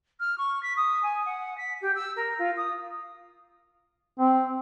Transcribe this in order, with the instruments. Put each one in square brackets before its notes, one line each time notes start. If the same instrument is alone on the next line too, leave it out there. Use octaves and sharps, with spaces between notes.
[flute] F6
C#6
B6
D#6
G#5
F#5
B6
G4
E6
A#4
F4
D#6
[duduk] C4